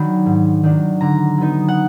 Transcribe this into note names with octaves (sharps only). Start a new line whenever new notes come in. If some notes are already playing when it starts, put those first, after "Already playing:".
Already playing: D#3 F#3 D4 B5
G#2
D#3 F#3 D4
D3 A#5
F#3 B3 D#4
F#5